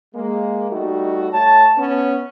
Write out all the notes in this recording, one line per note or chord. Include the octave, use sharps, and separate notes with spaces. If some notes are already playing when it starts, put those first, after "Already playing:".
G#3 A#3
G3 A3 D#4 F#4
A3 C#5 A5
B3 C#4